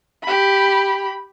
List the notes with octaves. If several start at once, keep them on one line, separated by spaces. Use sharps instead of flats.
G4 B5